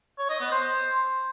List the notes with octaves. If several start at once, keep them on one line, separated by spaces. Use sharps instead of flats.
C#5
D#5
B3
C5